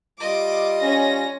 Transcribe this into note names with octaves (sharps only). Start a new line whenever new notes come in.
G3 F4 D#5 D6
C#4 A#6